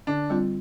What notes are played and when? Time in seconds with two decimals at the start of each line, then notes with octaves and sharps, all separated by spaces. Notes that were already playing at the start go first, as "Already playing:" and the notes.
0.07 D3 D4
0.30 G3 C4 F4